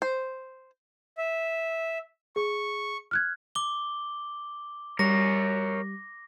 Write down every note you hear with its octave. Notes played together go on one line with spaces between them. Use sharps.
C5
E5
G#4 C#6
F6 F#6 G#6
D6 G7
G3 A#4 C#5 A#6